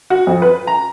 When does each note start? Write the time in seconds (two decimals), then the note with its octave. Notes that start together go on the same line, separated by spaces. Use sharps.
0.10 F#4
0.27 F2
0.42 B4
0.67 A#5